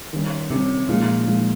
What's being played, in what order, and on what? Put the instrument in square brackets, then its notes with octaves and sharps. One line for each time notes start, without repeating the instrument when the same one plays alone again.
[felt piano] D#3 G3 C#4
[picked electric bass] C3 [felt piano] D#3 G3 C#4
[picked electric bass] A#2 [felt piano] F3 G#3 D#4
[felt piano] F3 G#3 D#4